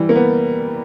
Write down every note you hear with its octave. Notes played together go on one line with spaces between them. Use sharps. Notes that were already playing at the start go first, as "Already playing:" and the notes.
Already playing: E3 G3
A#3
B3